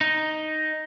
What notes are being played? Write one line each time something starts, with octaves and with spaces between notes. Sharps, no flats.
D#4